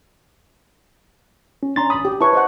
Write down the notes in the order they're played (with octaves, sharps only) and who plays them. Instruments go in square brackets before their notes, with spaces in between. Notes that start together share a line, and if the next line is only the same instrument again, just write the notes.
[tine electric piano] C#4
[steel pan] C#4 D4 [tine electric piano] A#5 C6 A6
[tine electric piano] G#1 D#6 [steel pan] B5
[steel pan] G4
[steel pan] E4 B4 C#5 [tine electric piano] A5 C#6
[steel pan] C5 D#5 F#5